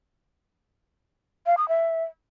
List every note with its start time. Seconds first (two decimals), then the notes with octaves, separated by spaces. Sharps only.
1.46 F5
1.57 D#6
1.69 E5